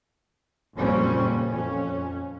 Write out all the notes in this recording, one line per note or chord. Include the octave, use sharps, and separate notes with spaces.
F#1 F2 A#2 G3 C4 C#4
F2 C#4